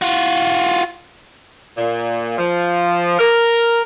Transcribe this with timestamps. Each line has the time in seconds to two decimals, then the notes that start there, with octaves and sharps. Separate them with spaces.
0.02 F4 F#4
1.77 A#2
2.38 F3
3.19 A#4